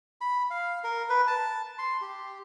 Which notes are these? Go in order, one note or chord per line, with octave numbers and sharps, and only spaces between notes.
B5
F5
A#4
B4
A5
C6
G4